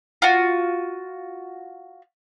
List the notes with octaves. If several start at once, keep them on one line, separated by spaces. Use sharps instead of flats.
F4 F#4